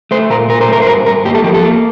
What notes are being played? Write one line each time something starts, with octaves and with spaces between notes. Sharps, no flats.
A3 C5
A#2 A#4
A#2 A#4
C5
A3 A#4
C5
G2 A#4
G2 A#4
A#3 G4
A4
F3 G4
A4
A#3